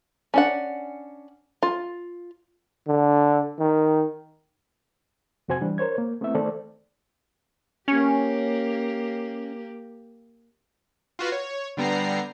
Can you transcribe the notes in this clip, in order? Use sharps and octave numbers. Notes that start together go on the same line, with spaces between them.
C#4 D4 F#5
F4
D3
D#3
F2 C3 F#4 C5 G#5 G#6
E3 G3 D4
A#4 C5 C#5 G#6
A#3
A3 B3 C4 E4 E5
D#3 A3 A4 C5 D5
A#3 C#4 G4
F4 F#4 B4 F5
C#5
D3 G3 B3 A#5 C7